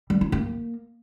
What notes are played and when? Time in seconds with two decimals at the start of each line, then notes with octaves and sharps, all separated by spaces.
0.10 G3
0.21 F4
0.32 A#3